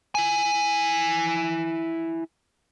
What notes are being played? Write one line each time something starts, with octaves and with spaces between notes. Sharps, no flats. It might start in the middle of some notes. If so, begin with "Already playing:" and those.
E4 G#5